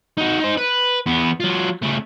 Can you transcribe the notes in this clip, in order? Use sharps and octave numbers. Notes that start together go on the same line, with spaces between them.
D#4 F#4
D#4 C5
B4
E2 B3
F#3 F4
C#3 A3